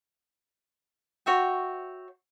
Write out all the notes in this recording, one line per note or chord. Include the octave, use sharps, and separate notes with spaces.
F#4 C#5 E5 G5